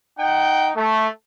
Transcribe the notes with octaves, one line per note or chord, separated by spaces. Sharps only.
D#4 F#5 G5
A3